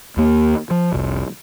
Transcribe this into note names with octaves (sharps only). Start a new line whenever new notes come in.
D#2 A#3
F3
F1 C2